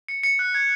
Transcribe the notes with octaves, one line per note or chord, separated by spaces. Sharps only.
C#7
C#7
F#6
G#6